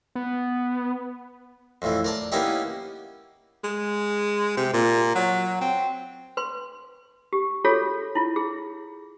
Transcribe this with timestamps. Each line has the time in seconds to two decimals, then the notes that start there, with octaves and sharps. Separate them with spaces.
0.15 B3
1.82 F2 A2 E3
2.04 A#4 D5 A5
2.32 A#3 B3 C#4 D#4 E4 G4
3.64 G#3
4.57 C3
4.73 A#2
5.15 F#3
5.61 C4
6.37 B4 C6
7.33 G4
7.64 F4 F#4 G#4 A4 C#5
8.15 E4 F4
8.36 G#4